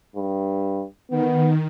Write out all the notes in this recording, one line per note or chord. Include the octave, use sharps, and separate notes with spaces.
G2
D#3 B3